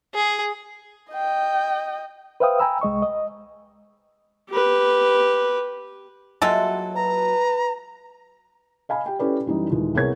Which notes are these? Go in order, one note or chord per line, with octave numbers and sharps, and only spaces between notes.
G#4
D#5 G5
B4 C5 E5 F5 G5 D#6
G5 G#5 A#5 B5 E6
C2 G#3 D#5 C#6
D#5
G4 B4
F#3 G#3 A#3 E4 F4 A4
B4 A#5
D#5 F5 G#5 B5
G4 G5
C#4 E4 G4 A4 B4 D5
F#2 E3 G3 D#4
D#2 A#2 E3 G#3
C2 B3 G#4 A#4 C#5 G#6